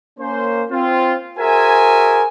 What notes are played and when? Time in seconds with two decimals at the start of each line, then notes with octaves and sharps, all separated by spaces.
0.19 A#3 C#4 C5
0.71 C4 F4
1.39 F#4 G#4 A#4 C5 E5 G#5